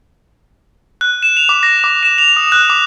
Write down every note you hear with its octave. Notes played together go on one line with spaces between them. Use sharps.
F#6
E7
F7
D6
A#6
D6
E7
F7
D#6
F#6
D6